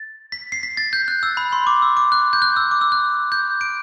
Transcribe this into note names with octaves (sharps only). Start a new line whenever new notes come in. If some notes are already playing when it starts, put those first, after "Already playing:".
Already playing: A6
B6
C7
B6
A6
G6
F#6
E6
B5
C6
D6
E6
D6
F#6
G6
F#6
E6
D6
E6
F#6
G6
D7